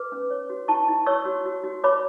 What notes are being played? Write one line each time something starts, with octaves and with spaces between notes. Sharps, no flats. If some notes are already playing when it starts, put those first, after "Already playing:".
Already playing: B4 D6
C#4
C#5
F#4
E4 A5 C#6
E4
C#5 C#6 E6
F#4
F#4
F#4
C#5 B5 D6